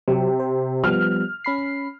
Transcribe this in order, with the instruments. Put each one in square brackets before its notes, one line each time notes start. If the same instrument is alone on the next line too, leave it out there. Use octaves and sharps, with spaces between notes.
[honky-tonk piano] C3 [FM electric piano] F#3
[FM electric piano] C5
[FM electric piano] F3 G3 B3 [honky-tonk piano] F6
[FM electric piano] C#4 B5 C7